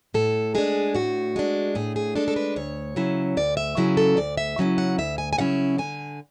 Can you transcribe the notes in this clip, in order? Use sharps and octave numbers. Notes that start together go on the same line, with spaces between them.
A2 A4
G#3 D4 G#4
A2 F#4
G#3 D4
A2 G#4
G#4
G#3 D4 A4
A4
B4
D2 C#5
C#3 F#3 C#4 E4
D2 D5
E5
C#3 F#3 C#4 E4 G#4
A4
D2 D5
E5
C#3 F#3 C#4 E4
F#5
D2 E5
G#5
G#5
C#3 F#3 C#4 E4 F#5
D3 G#5